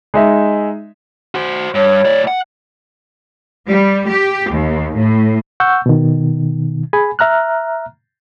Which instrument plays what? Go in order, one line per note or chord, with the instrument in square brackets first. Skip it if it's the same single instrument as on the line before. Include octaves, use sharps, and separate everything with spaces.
[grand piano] G#3 D#4 E5
[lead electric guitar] F#4 C5
[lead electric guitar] G2 [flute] C#5
[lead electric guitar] A2 D5
F#5
[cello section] G3
G4
D#2
A2
[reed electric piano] F#5 C#6 E6 G6
B2 D#3
G#4 G#5 B5
E5 A#5 F6 F#6